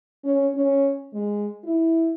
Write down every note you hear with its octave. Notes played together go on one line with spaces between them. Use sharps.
C#4
C#4
G#3
E4